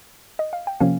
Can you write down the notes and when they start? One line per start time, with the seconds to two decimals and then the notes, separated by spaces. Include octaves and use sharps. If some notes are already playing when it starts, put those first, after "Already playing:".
0.39 D#5
0.53 F5
0.67 G5
0.80 C3 F3 A#3 C#4 F5 G#5